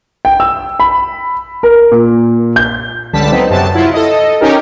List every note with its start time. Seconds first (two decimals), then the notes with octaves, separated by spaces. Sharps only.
0.25 G5
0.40 E6
0.80 B5
1.63 A#4
1.92 A#2
2.56 G6
3.13 C#2 D3 G3 A5 B6
3.32 F#3 B3 C4 D#4
3.50 F#2 C3 F#3 B3 A5
3.74 F#3 E4 F4
3.93 A4 D#5
4.40 C#4 D#4 G4 A#4